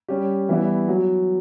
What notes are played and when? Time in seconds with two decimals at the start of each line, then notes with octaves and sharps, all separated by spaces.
0.08 G3 C#4 G4
0.49 E3 G3 B3 E4
0.88 F#3